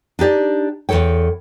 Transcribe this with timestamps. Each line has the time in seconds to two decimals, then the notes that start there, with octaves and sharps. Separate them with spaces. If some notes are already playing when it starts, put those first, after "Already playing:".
0.19 D4 D#4 G4 D5
0.89 E2 G2 A4 C#5 G5